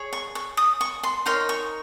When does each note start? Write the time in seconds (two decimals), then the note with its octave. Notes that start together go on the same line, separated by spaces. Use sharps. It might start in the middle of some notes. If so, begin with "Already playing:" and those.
Already playing: G#4 C#5
0.13 C#6
0.35 C#6
0.57 D#6
0.81 C#6
1.03 C6
1.26 D#4 A#4 C#5 C6
1.49 C#6